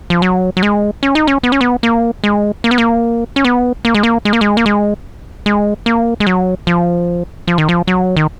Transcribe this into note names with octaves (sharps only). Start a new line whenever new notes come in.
F3
F#3
F#3
G#3
C#4
D#4
C#4
B3
C#4
B3
A#3
G#3
A#3
B3
A#3
C#4
B3
A#3
G#3
A#3
G#3
A#3
G#3
A#3
G#3
G#3
A#3
G#3
F#3
F3
F3
D#3
F3
F#3
D#3